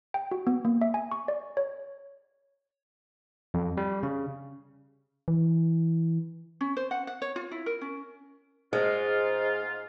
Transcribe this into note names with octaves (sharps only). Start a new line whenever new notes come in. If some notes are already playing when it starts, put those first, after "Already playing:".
G5
F#4
B3
A#3
E5
G#5
C#6
D5
C#5
F2
G3
C#3
E3
C#4
C5
F#5
F#5
C#5
F4
E4
A#4
C#4
G#2 G#3 F4